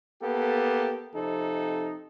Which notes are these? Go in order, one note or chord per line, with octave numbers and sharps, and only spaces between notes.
A#3 B3 G4 A4
F2 C3 D#4 A4